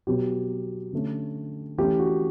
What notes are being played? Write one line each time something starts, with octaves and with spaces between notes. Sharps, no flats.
B2 F#3 B3 G4
D3 A3 C#4
E3 A3 C#4 G4
F#4